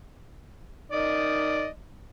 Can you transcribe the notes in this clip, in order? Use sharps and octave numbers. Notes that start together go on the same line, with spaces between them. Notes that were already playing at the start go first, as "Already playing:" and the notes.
D#3 D5 D#5